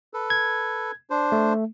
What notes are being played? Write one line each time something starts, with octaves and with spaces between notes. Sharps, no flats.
A4 B4
G#6
D4 C5
A3